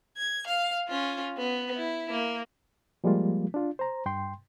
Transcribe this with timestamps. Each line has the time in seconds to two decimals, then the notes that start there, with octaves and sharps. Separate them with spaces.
0.17 G#6
0.47 F5
0.89 C#4 F4
1.38 B3
1.76 E4
2.11 A#3
3.04 F3 G3 G#3 A#3 F4
3.54 D4 F4
3.79 C5 A#5
4.06 G2 G5 C6